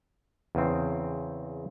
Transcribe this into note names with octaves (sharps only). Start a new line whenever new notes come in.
E2 C#3 C4